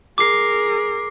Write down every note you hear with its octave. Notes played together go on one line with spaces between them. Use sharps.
G#4 A#4 D6 C7